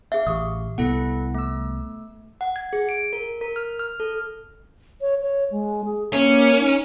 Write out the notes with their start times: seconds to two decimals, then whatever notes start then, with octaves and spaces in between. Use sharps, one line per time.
0.12 G#4 E5 F5
0.27 A1 G4 D6 D#6
0.78 C2 B3 E4 A4 F#5
1.35 A3 E6
2.41 F#5
2.56 G#6
2.73 G#4
2.89 D7
3.13 A#4
3.41 A#4
3.56 F6
3.79 F6
4.00 A4
5.01 C#5
5.22 C#5
5.51 G#3
5.85 G#4
6.13 A#3 C#4
6.60 D#4